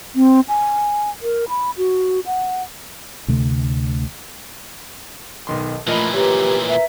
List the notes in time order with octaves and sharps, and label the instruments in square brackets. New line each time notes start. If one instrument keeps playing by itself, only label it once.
[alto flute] C4
G#5
A#4
B5
F#4
F#5
[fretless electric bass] D2 C3 A3
[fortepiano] B1 D#3 C6
[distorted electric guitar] A#2 E3 [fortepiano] F3 A#4 D#5 [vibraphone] A3 B5
[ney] G4 [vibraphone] A#4 B4 A#5 [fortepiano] C#5
[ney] E5